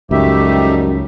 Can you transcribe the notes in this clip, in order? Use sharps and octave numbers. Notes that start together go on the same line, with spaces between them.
C#2 F#2 F3 G3 A3 D#4 G4 E5